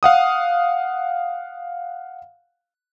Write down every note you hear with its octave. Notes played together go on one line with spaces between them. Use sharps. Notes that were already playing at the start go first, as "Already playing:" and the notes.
F5 F#5 D#6